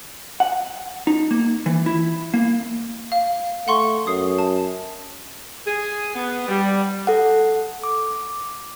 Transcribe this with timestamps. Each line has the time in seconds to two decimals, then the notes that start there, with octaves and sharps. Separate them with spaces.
0.40 F#5
1.07 D#4
1.31 A#3
1.66 E3
1.86 E4
2.34 A#3
3.12 F5
3.68 A3 F#5 C6 C#6
4.07 F#2 D#6 C7
4.38 A5
5.66 G#4
6.15 B3
6.48 G3
7.07 A4 F#5
7.84 D6